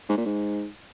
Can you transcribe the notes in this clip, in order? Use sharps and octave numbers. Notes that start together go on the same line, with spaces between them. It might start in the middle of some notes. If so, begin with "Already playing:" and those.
G#2
A#2
G#2